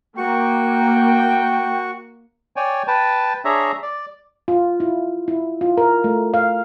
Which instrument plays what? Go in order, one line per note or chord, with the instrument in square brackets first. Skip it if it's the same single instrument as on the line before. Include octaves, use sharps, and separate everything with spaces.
[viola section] A#3 [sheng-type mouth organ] F#4 C#6 [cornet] G5
[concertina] C#5 D5 G5 G#5
B4 G5 A5
D4 G#4 C#5 E5 A#5
D5
[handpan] F4
E4
E4
F4
A#4
A3
F5